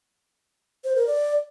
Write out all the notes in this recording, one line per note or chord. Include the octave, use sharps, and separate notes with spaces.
C5
A#4
D5